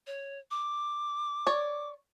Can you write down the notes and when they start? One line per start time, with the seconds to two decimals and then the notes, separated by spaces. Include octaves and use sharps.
0.07 C#5
0.51 D6
1.47 C#5 D5